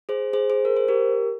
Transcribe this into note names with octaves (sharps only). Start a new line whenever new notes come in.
G#4 C5
G#4 C5
G#4 C5
A#4
C5
G4 A#4